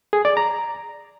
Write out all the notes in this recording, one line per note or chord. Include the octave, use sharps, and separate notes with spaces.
G#4
D5
A#5